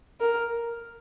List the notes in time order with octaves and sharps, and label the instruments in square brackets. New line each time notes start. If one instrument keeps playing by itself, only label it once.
[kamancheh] A#4